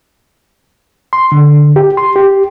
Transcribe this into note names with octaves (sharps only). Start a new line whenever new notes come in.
C6
D3
G4
C6
G4